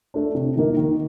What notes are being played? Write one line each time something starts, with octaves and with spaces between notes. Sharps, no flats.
A3 D4
C3
D#3 A#3 D#4
D#3